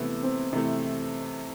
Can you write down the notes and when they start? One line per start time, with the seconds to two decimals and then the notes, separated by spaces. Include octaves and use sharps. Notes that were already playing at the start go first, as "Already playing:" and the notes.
Already playing: C3 E3 A3 B3
0.23 C4
0.53 C3 E3 A3 C4